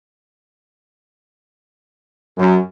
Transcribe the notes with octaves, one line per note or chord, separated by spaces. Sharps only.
F#2